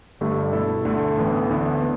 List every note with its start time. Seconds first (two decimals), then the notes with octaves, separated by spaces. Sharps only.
0.21 G1 G2 D3 A3 G4
0.52 B2 A3 E4 A4
0.85 D2 D3 A3
1.17 A1 A2 E3 B3
1.49 D2 D3 B3 D4
1.81 B3